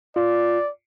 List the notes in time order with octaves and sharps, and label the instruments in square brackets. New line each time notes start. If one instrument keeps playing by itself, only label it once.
[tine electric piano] F4 [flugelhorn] D5